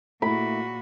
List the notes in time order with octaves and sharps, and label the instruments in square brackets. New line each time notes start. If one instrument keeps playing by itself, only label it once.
[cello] A#2 F#4 [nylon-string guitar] A3 E4 [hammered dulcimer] B5